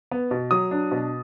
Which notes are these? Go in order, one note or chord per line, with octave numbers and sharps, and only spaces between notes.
B3
B2
F#3 D#6
D4
B2